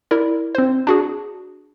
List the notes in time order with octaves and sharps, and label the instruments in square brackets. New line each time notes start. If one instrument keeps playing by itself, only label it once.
[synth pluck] E4 A#4 D5
C4 C5
D4 F#4 G#4